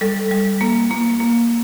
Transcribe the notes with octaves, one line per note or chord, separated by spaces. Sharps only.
G3 A4
G3
A#3
A#3
A#3